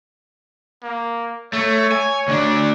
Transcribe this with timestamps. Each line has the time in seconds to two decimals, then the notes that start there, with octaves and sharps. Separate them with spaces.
0.83 A#3
1.53 A3 C#5
1.92 G#5
2.28 D2 D4